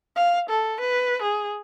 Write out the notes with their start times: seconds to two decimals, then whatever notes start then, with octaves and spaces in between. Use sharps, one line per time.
0.16 F5
0.49 A4
0.80 B4
1.22 G#4